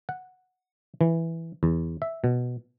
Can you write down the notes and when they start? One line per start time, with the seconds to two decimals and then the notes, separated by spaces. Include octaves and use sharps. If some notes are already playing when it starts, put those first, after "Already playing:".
0.09 F#5
1.01 E3
1.63 E2
2.02 E5
2.24 B2